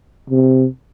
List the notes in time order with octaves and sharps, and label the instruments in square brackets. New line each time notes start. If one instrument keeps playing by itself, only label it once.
[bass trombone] C3